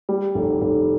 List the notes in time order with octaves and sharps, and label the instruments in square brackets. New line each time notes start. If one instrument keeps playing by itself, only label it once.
[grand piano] G3
F1
F1